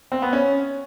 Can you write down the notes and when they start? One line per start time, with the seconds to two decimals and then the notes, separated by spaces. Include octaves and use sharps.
0.12 C4
0.22 B3
0.33 C#4